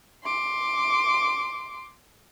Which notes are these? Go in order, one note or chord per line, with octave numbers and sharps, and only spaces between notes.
C6 D6